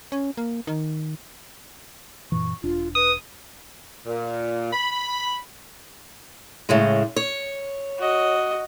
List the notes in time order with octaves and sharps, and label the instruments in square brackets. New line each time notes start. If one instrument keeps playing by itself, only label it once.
[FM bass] C#4
A#3
D#3
[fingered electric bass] F#2 A#2 E3 [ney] C#6
[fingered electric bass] E1 D4 [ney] F4
[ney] B4 [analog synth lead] D#6
[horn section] A#2
B5
[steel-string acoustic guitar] A2 C#3 G#3
C#5
[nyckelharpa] F#4 D#5